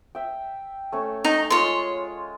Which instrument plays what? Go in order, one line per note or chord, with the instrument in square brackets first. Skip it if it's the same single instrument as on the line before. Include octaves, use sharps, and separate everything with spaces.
[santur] E5 G5
A3 C#4
[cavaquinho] D#4
[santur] G#3 F4 [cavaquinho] C#5 C6